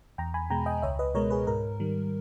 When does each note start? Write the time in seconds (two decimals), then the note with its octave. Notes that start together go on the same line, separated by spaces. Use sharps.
0.18 E2 G5 A#5
0.34 G#5 B5
0.50 B2 G#3 G5 A#5
0.66 D#5 G5
0.82 C#2 C#5 E5
0.99 B4 D#5
1.15 B2 G#3 A#4 C#5
1.30 G#4 B4
1.47 G#2 A#4
1.80 D#3 G3